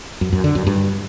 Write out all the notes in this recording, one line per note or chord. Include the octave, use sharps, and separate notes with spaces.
F#2
F#2
D3
F#2
G2